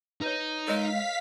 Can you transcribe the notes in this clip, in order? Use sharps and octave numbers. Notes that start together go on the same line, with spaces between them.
D#4 B4 C#5
G#3 A#4 C#5 D#5 F5 B6